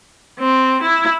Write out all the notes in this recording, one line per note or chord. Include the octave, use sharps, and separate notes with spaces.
C4
E4